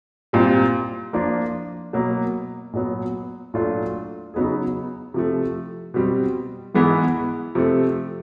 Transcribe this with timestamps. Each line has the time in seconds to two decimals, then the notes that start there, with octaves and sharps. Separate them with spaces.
0.33 A#2 G3 C4 F4
1.13 F3 A#3 D4 F4
1.93 B2 F#3 A#3
2.73 A#2 F#3 B3
3.54 A#2 F#3 A3 D4 F4
4.34 C#3 F#3 B3 D#4 G#4
5.14 C3 F3 A3
5.94 B2 G3 C4
6.75 G#2 E3 G#3 B3
7.55 C3 F3 A3